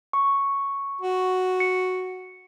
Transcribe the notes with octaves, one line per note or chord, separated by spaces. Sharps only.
C#6
F#4
C#7